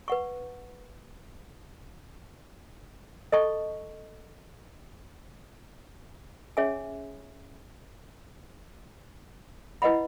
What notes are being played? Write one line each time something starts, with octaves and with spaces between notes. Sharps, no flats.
B4 F#5 C#6
A4 D#5 A5 C#6
C#4 G#4 C#5 E5 G#5
E4 B4 D#5 F#5 B5